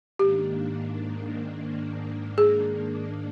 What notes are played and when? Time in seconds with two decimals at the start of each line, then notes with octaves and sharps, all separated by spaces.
0.19 G#2 D#3 A#3 D4 G4
2.38 G#4